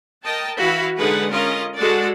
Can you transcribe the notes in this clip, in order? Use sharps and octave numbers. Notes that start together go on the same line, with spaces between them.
A#4 D#5 G5 A5
E3 E4 F#4 F5 B5
D3 G#3 D#4 G#4 B4 F#5
C#4 F4 A#4 D#5
G#3 F#4 A4 D5 F#5